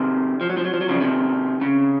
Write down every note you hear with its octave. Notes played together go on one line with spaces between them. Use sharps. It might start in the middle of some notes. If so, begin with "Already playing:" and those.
Already playing: C3 D#3
F3
F#3
F3
F#3
F3
F#3
C#3 F3
C3 D#3
C#3